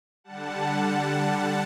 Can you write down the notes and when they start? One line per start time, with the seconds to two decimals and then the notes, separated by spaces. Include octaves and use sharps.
0.24 D3 G3 F#5 A5